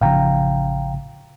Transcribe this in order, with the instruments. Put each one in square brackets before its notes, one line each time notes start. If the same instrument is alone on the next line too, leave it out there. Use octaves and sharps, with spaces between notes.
[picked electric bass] A1 C#3 F3 [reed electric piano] F5 G5 A#5